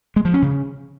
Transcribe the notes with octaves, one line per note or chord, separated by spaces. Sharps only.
G#3
F3
C#4
C#3